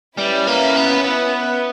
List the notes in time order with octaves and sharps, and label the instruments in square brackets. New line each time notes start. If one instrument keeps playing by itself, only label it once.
[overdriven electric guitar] G3 [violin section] C#4 E4 B4 E5
[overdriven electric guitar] A#3
B3
B3